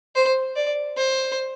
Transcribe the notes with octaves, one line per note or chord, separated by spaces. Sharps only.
C5
D5
C5